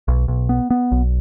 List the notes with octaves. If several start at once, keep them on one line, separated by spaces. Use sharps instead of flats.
B1
B1
B3
B3
B1